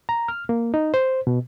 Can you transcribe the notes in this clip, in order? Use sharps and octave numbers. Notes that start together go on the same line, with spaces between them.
A#5
F6
A#3
D#4
C5
B2